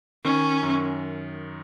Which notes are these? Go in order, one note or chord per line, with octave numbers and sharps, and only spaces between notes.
D#3 C#4
F#2